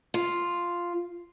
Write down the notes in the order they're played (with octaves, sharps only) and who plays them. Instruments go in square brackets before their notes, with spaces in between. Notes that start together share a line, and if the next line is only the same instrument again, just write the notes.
[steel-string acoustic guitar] F4